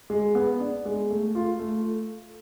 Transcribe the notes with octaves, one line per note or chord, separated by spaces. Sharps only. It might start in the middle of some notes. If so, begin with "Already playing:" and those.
G#3
B3
D4
G#3
A3
F4
A3